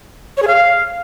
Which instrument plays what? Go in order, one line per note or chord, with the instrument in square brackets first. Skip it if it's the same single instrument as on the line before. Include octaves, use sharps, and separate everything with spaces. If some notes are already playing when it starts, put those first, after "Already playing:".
[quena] C#5
G#4
F5